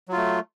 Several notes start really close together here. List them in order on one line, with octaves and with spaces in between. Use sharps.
F#3 F4 A3